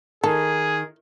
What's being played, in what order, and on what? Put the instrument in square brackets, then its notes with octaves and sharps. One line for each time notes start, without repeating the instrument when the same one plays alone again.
[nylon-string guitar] D#3 [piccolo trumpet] G#4 [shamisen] A4